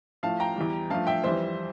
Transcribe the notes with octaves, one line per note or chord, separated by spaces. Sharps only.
A2 F3 A3 F5 A5
G5 A#5
E2 E3 G3
G2 F3 A3 F5 A5
E5 G5
F2 E3 G3 C5 E5